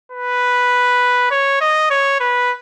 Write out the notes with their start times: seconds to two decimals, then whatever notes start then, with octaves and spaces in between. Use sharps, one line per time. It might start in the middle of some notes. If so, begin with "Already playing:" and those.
0.12 B4
1.31 C#5
1.61 D#5
1.90 C#5
2.20 B4